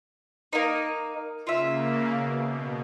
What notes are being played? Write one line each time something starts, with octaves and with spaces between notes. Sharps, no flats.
A#3 D#4
C#3 A#3 F4 E5
B2